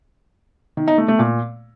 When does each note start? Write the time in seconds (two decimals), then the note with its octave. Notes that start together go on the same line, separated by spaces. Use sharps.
0.77 D#3
0.88 D#4
0.98 A3
1.08 A3
1.19 A#2